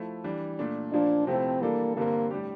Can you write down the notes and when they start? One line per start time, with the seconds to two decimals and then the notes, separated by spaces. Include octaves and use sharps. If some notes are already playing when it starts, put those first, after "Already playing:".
Already playing: F3 A3 E4
0.24 E3 G3 D4
0.59 A#2 A3 D4
0.92 A#2 F3 A#3 D4
1.27 C3 F3 A3 C4 E4
1.61 E3 G3 A#3 D4 A4
1.97 G2 D3 G3 A#3 C4
2.31 A2 G3 D4 G4